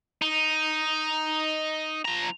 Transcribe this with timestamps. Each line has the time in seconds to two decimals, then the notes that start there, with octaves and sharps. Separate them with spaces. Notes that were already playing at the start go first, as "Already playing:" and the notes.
0.22 D#4
2.05 F3 A#5